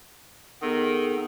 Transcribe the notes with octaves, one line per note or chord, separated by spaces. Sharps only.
D#3 B3 G#4 A4